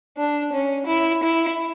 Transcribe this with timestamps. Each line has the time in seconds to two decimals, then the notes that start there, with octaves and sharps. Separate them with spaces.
0.17 D4
0.53 C#4
0.87 E4
1.23 E4